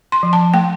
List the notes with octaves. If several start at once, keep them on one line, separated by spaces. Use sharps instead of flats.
C6
F3
A5
A3 G5